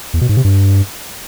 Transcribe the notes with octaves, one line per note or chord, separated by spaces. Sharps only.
E2
B2
G#2
C3
G2